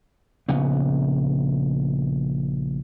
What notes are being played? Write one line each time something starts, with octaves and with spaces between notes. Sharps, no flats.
A#1 C#3 B3